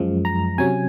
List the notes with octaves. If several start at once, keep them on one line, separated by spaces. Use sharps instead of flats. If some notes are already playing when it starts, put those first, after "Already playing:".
Already playing: F#2 F3 G#3
A#5
C3 F#3 C#4 G#5